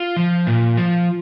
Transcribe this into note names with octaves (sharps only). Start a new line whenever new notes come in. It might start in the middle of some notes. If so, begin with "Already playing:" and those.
Already playing: F4
F3
A#2
F3